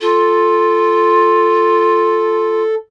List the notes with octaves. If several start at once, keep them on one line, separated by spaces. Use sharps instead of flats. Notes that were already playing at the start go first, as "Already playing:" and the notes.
F4 A4